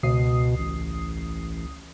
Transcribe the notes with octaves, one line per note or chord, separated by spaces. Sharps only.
C#2 B2 D#6 C7
A1